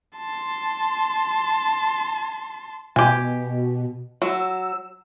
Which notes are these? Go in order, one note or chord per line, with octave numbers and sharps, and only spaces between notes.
A5 C6
B2 G4 G#5
F#3 E6